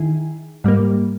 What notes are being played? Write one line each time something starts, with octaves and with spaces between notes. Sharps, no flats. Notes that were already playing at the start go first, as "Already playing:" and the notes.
Already playing: D#3 E4 G#4
G#2 G3 A#3